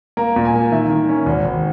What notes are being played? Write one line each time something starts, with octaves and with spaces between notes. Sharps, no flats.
A#3 A#5
A#2
G#5
A#3
D#3 E5
D#3
C#4
G#1
G#1